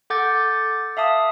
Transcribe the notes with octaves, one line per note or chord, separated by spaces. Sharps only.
A4 F#5 D6 G6 A6
E5 F5 A5 D#6